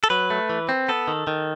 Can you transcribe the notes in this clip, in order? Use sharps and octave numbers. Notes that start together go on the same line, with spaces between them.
A4
F#3 B4
A3
E3
C4
B3 A4
D#3
D#3